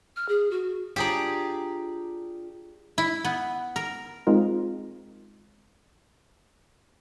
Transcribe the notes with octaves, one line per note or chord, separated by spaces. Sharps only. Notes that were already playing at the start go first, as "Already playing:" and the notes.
F6
G#4
F#4
D4 F4 G4 G#4 D5 A#5
E4
B3
A#4
G#3 C4 D#4 F4 A#4